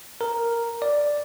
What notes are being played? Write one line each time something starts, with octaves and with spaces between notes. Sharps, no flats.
A#4
D5